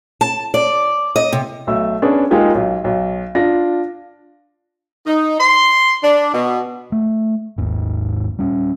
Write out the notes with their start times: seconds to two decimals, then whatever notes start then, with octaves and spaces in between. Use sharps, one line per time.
0.21 A5
0.54 D5
1.16 D#5
1.33 C3
1.67 B1 A3 E6
2.02 B3 C#4 D4 G#4
2.31 G#3 A#3 D#4 F4 G4 G#4
2.55 B1
2.84 B1
3.35 D4 F4 A#6
5.06 D#4
5.40 C6
6.02 D4
6.33 B2
6.92 A3
7.58 G#1 D#2 G#2
8.39 G3 C#4